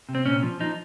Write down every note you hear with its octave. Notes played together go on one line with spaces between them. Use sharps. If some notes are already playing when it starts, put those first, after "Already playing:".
C3
C4
A#2 C#4
F3
F3 D#4